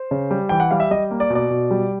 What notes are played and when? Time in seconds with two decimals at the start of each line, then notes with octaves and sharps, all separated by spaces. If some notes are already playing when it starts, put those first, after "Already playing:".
Already playing: C5
0.11 C#3
0.31 G3
0.49 E3 G5
0.60 F#5
0.71 G3 F5
0.80 E5
0.91 G3 D#5
1.11 A#3
1.20 D5
1.30 B2
1.35 D5
1.50 B2
1.71 G3